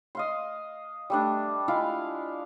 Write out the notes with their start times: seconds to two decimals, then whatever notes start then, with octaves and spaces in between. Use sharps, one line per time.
0.15 D#5 F5 C6
1.10 G3 A3 D4
1.68 G#3 E4 F4 F5